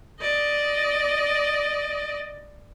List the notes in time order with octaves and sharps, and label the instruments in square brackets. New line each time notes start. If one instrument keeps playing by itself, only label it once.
[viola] D5 D#5